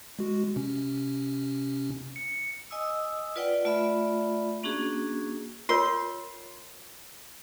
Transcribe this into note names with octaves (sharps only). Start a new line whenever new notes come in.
G#3 F#4
C3 C#4
C#7
D#5 G#5 D#6 E6
F4 B4 D5 F#5 G5
A3 F4 D5 E5 B5
A#3 C#4 D4 F#4 G#4
F4 A#4 C#5 C6